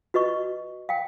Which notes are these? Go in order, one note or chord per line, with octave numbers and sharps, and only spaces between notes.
F#4 B4 D#5 C#6
F5 G5